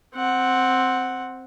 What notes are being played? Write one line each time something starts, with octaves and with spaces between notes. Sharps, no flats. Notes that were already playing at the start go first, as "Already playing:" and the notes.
C4 F#5